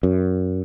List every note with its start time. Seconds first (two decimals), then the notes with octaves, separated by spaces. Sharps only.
0.03 F#2